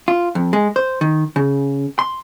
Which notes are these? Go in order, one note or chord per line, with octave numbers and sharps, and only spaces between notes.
F4
F2
G#3
C5
D#3
C#3
C6